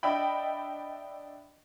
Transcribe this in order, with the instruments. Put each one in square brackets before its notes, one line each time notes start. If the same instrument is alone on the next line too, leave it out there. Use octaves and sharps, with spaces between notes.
[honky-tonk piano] D4 D#5 E5 G5 B5